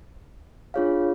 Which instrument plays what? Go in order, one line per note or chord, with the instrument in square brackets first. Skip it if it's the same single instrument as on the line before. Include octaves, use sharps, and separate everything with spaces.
[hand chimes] D4 F4 G#4 C#5 F5